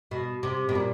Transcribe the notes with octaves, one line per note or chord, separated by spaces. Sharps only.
B2
C3
B2
A#2